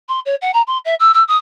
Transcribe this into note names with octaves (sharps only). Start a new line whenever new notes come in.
C6
C#5
F#5
A#5
C6
E5
E6
E6
D#6